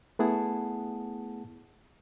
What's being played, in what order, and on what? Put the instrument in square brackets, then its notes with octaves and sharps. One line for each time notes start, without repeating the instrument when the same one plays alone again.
[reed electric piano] A3 B3 E4 G#4 F#5 A5